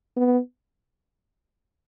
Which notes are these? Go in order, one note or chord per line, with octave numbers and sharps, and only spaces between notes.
B3